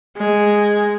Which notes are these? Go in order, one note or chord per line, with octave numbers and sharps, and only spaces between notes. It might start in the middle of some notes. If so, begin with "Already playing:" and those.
G#3